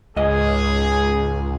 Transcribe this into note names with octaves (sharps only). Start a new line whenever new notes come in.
C#2 G#2 G#4 D#5